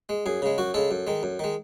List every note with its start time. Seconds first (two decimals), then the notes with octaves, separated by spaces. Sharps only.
0.09 G#3
0.26 F#2 G#4
0.42 C#3 G#3
0.58 F#2 F#4
0.74 C#3 G#3 A4
0.91 F#2
1.07 D#3 G#3
1.23 F#2
1.39 D#3 G#3